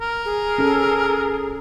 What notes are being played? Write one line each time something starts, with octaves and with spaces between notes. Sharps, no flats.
A#4
G#4
C#4 A4